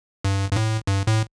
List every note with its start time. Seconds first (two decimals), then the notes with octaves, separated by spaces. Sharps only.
0.24 G2
0.52 G2
0.56 A2
0.87 G2
1.07 A2